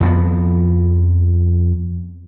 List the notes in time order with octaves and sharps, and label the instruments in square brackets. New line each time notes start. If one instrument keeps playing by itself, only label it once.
[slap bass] F2 F3 A#3 B3